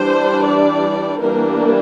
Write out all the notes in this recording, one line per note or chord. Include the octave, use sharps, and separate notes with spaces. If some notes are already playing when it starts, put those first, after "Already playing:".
Already playing: E3 G3 D4 C5
D5
E3 G3 A#3 D4 A#4